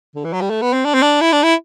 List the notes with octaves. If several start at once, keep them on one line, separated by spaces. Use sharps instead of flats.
D3
E3
F#3
G3
A3
B3
C4
D4
C4
D4
E4
D4
E4